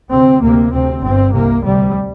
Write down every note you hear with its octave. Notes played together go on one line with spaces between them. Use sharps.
D2 C3 C4
D2 C3 A#3
D2 C3 C4
G1 G2 C4
C2 C3 A#3
D2 C3 G3